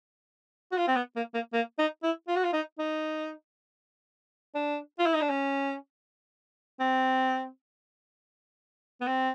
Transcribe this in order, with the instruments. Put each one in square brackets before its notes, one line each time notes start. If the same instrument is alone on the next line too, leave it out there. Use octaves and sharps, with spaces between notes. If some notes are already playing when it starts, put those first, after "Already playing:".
[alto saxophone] F#4
F4
C4
B3
A#3
A#3
A#3
D#4
E4
F4
F#4
F4
D#4
D#4
D4
F4
E4
D#4
D4
C#4
C4
B3
C4